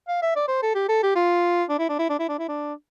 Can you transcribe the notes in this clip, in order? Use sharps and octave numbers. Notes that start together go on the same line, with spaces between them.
F5
E5
D5
C5
A4
G4
A4
G4
F4
D4
E4
D4
E4
D4
E4
D4
E4
D4